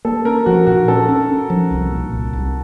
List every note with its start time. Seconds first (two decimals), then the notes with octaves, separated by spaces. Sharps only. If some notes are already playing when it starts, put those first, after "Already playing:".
0.05 A#3 A4
0.25 C#4 A#4
0.46 F3 F#4
0.67 A#2 F#4
0.88 C#4 A4
1.09 C#4
1.29 C#4
1.50 F3
1.71 C2
1.91 A#2
2.12 C2
2.33 C2